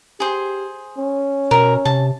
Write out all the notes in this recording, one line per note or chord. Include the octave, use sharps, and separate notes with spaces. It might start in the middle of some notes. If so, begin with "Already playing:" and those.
G4 G#4 C5
C#4
B2 A#4 E5
C3 A5